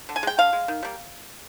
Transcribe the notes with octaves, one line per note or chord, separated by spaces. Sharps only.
D3
G#5
G#3 G5
D3 F5
G#3
D#3
G3 A#3